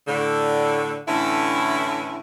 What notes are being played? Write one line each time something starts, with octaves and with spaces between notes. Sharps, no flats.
A2 D3
A2 D3 E3 C#4 E4